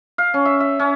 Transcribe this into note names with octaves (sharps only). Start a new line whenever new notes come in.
F5
C#4
E5
E5
C#4